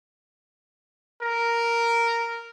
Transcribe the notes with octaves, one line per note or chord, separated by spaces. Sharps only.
A#4